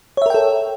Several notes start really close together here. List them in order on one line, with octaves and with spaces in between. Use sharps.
C#5 E5 A#4 G5 A4